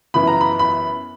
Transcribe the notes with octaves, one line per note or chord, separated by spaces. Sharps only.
F#2 E3 B3 B5
A#5
B5
B5